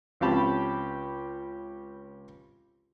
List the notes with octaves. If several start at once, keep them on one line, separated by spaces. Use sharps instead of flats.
C#2 C4 C#4 G4 A5 B5